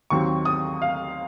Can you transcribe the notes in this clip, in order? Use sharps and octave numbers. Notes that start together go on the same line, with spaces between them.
D#2 D#3 F#3 C4 C#6
D#6
F5